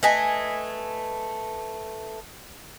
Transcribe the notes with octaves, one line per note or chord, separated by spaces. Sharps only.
A3 B4 D#5 G#5